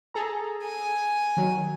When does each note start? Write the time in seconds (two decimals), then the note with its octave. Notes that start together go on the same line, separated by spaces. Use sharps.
0.14 G#4 A4 A#5
0.64 G#5
1.37 D#3 F#3